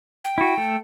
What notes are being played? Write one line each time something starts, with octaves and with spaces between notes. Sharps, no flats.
G5
E4 F#4
A3 A4